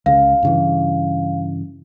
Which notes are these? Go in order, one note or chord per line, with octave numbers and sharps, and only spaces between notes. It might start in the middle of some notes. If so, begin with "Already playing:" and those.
C#2 C#3 F5
G2 C#3 E3